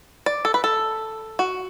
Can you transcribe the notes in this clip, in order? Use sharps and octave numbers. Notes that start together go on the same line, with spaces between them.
D5
A4
B4
A4
F#4